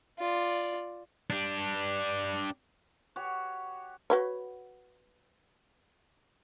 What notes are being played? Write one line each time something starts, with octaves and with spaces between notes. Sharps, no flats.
F4 D5
D4 G4
F#4 G4 C#5
F#4 B4 C#5